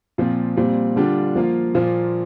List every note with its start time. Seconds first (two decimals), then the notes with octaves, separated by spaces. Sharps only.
0.18 A#2 F3 C4 F4
0.57 A#2 G3 C4
0.96 D3 G3 D4 F4
1.36 F3 A#3 F4
1.75 A#2 F3 A#3 F4